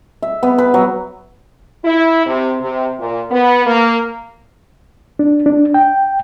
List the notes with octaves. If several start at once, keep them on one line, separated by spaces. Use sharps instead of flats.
E5
B3
B4
F#3
E4
C3
C3
A#2
B3
A#3
D4
D4
G5